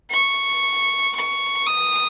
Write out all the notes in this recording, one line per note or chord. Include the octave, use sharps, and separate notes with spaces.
C#6
C#6
D#6